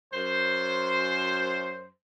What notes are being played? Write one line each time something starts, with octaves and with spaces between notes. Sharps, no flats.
F#2 C5